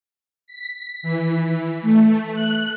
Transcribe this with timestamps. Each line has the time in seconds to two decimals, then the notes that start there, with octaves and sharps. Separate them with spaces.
0.47 B6
1.03 E3
1.82 A3
2.35 F#6